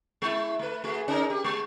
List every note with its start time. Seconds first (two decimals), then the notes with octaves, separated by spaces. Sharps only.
0.22 G#3 E4
0.59 A3 B4
0.84 A3 F#4 G#4
1.08 C#4 D#4 A#4
1.30 G4
1.44 G#3